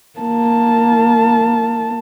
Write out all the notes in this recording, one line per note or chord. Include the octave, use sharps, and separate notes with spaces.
A#3 A5